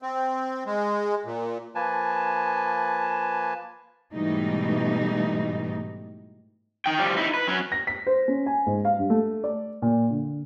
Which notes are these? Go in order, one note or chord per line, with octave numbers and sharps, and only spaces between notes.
C4
G#3
A#2
F3 A#3 B4 G#5 A5
G#2 B2 E3 G3 A3 D#4
D#4 G5
F3 G3
D#4 E4
B4
F#3 C#4
A#6
B6
C5
C#4
G#5
G#2
F5
G2
A3
D5
A#2
D3